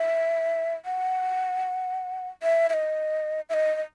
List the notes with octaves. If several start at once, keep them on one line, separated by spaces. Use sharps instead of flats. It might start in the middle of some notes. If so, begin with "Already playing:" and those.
Already playing: E5
F#5
E5
E5
D#5
E5
D#5
D#5